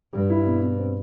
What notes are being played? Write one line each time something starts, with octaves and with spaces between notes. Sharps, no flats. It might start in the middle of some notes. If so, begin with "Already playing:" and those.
G2 G3
E4
B2
B2
C4